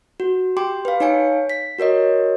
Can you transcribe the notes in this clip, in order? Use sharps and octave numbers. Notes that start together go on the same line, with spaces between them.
F#4
G4 G5 C6 D6
B4 F5
D#4 C#5 F5 G#5 C#7
B6
F#4 A#4 C#5 D#5